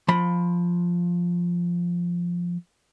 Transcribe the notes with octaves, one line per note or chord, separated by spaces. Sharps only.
F3 B5